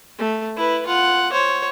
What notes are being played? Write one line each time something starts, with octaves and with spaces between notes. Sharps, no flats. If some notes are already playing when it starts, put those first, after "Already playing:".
A3
E4 B4
F4 F#5
C5 C#5